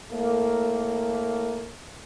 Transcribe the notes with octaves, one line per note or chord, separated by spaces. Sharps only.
A2 A3 A#3